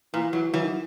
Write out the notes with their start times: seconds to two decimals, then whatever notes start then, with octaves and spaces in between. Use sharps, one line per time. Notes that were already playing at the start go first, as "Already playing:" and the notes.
0.14 A#2 E3
0.33 E3 F#3
0.53 E3 F#3
0.63 D#3